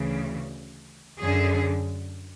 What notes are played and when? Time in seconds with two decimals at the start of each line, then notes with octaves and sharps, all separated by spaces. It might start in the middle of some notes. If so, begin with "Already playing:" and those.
Already playing: D2 C#3 E3
1.19 F#2 D3 G#4